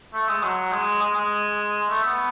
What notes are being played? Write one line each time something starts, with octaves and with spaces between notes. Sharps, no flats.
A3
G#3
F#3
G#3
G#3
G#3
A3
B3